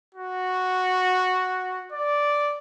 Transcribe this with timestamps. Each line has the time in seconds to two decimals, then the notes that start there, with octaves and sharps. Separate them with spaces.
0.14 F#4
1.92 D5